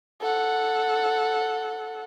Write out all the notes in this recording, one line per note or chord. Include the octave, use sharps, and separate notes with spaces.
A4 F#5